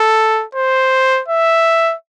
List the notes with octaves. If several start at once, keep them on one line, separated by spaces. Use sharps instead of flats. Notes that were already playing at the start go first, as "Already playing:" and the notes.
Already playing: A4
C5
E5